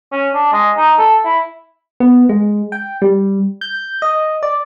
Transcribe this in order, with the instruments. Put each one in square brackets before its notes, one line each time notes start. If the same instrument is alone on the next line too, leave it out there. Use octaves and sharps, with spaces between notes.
[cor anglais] C#4
D4
G#3
D#4
A4
E4
[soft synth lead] B3
G#3
G5
G3
G6
D#5
D5